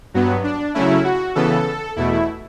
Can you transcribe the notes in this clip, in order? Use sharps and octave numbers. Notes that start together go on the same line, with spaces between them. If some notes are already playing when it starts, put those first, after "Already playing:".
G2 F#3 B3
D4
C#3 F#3 A3 C#4 E4
F#4
C#3 E3 B3 A4
E2 B2 A3 E4